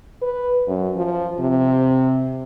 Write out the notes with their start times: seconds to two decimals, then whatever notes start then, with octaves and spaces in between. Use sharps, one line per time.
0.22 B4
0.67 F#2
0.96 F3
1.40 C3